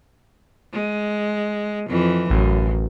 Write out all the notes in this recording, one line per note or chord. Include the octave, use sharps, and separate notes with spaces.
G#3
F2 E3
A1 F#2